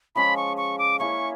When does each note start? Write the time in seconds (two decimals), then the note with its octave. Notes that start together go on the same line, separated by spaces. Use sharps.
0.15 F3 G#3 C#4 B5
0.37 C#6
0.57 C#6
0.78 D6
0.99 A#3 C#4 E4 G#4 C#6